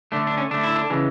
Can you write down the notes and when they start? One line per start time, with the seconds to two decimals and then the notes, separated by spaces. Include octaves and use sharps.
0.12 D3 A3 D4
0.27 D4
0.37 C#4
0.51 D3 A3 D4
0.63 E4
0.76 D4
0.90 C#3 E3 G#3